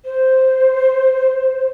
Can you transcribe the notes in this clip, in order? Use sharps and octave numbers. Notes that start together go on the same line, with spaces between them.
C5